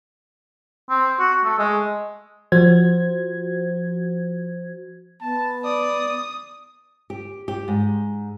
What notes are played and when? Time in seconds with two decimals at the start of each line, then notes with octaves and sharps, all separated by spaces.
0.90 C4
1.19 F#4
1.44 A3
1.58 G#3
2.52 F3 F#4 C5 G#6
5.21 B3 A5
5.65 D5 D#6
7.10 G4
7.48 G4
7.68 G#2